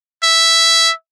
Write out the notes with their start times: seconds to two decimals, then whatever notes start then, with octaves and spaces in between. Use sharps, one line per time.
0.23 E5